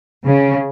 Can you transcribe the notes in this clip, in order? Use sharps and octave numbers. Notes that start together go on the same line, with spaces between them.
C#3